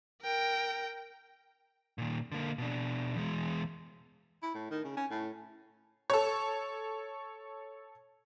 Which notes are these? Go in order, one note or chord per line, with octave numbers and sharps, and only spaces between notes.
A#4 G5
A#2 D#3
D3 A#3
B2 D4
E2 G#3
E4
A2
D#3
C#3
C#4
A2
A4 C#5